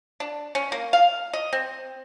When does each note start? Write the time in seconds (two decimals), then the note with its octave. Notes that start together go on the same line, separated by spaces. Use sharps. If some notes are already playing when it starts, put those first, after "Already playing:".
0.20 D4
0.55 C#4
0.72 A#3
0.93 F5
1.33 D#5
1.53 C4